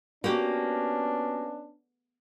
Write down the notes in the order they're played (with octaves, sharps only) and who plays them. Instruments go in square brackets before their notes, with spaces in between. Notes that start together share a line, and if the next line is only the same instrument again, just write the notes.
[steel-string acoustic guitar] A#3 [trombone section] B3 C#4 D4 [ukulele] F#4 G4